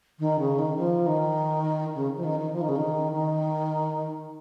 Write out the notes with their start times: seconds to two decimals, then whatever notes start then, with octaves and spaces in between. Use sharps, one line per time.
0.19 D#3
0.39 C#3
0.59 D#3
0.77 F3
1.06 D#3
1.95 C#3
2.16 F3
2.24 D#3
2.39 D#3
2.53 F3
2.61 D#3
2.69 C#3
2.76 D#3
3.12 D#3